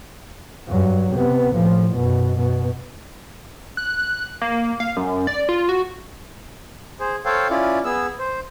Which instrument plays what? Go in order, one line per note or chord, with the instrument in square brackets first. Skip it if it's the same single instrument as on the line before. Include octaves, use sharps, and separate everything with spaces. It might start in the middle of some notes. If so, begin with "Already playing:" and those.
[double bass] G2 F#3
C3 B3
A2 F3
F#2 B2
B2
[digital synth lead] F#6
A#3
F5
F#2
D5
F4
F#4
[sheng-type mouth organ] G#4 C5
A4 C5 C#5 F5 G5
C#4 E4 F4 D5
B3 G#4 E6
C5